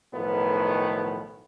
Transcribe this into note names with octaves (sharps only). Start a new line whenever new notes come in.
B1 A2 D#3 F3 B3